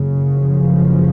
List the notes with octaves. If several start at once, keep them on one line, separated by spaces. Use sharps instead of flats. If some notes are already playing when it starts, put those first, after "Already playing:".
Already playing: F#1 F#2 C#3
F3